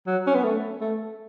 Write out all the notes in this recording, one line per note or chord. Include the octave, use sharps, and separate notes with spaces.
F#3
C#4
B3
A3
A3